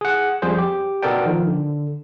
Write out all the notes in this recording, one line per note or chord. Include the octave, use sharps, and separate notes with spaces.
G#4 F#5
F2 G3 G#4 C5
G4
B2 B3 A4 A#4 D5 G5
D#3 F3
D3